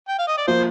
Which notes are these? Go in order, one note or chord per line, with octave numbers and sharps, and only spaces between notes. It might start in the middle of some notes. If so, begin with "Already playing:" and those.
G5
F5
D#5
D5
F3 A#3 F4 C5